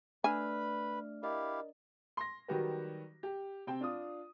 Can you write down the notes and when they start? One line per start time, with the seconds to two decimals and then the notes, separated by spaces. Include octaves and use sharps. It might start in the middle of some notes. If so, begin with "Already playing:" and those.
0.24 A3 D4 B4 E5 G#5 B5 F6
1.23 E4 G4 A#4 D#5 F5
2.17 C6 A#6
2.48 D#3 F#3 G3 F#4 G4 B4
3.23 G4
3.67 C3 C4 G5
3.81 D4 F4 D#6